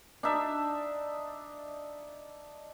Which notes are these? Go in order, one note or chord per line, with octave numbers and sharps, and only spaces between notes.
D4 D#4 E5